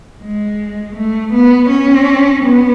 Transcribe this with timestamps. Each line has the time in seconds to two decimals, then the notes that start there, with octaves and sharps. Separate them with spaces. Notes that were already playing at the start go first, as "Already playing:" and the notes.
0.21 G#3
0.96 A3
1.33 B3
1.70 C#4
2.44 B3